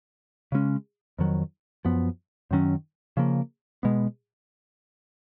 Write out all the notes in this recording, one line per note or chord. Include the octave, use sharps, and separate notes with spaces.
C#3 G#3 C#4
F2 D#3 F#3
F#2 F3 B3
F#2 D#3 F#3 C#4
C#3 F3 A#3
B2 G#3 B3